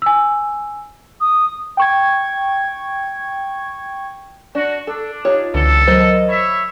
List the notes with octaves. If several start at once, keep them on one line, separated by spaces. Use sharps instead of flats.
G#5 E6
D#6
G5 C#6 G#6
D4 F#4
D4 A4
D#4 F4 G4 C#5
C#2 D3 E3 A4
F#3 A#4 C5 D#5
C#5 E5 B5